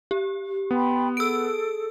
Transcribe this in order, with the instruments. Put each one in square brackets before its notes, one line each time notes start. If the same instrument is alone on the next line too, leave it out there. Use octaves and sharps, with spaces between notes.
[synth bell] G4
[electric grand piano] B3 [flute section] G5 B5 C6
[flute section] G#4 A4 [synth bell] E6 D7